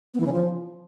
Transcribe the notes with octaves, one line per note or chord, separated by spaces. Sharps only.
B3
E3
C#3
F3